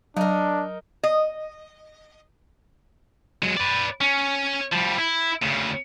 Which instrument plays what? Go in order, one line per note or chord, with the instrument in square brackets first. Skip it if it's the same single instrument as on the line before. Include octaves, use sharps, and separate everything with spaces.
[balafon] F#3 [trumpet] D4 [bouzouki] D#4 A#4
[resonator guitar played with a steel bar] D#5
[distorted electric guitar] F#3 G#3
B4 D5
C#4
F3 G3
E4
D2 C#3